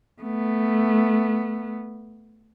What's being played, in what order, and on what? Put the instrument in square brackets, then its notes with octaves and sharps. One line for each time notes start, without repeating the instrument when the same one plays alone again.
[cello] A3 B3